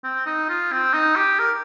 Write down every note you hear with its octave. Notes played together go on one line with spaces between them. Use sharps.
C4
D#4
F4
C4
D#4
G4
A#4